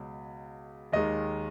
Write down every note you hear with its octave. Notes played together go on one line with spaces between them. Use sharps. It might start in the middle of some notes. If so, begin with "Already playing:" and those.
Already playing: C#2 B2 F#3
D#2 D#3 G#3 D#5